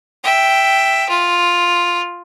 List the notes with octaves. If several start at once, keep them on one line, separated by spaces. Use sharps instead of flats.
E5 G5
F4